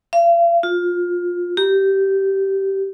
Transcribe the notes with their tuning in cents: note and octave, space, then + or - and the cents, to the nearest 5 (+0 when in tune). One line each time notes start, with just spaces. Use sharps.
F5 -40
F4 +20
G4 -15